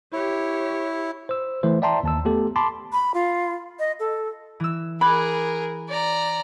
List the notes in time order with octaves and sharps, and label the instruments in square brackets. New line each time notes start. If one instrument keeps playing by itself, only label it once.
[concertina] E4 [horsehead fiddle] G4 C#5
[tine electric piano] C5 E6
E3 A3 C5
D5 E5 G5 A5 A#5 C6
D#2 A5 E6
A3 B3 G4 A4
A5 B5 C6 D6
[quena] B5
F4
D#5
A4
[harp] E3 E6
[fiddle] G#4 A#4 [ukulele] B5 [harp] D6 F#6 G#6
[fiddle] D5 A#5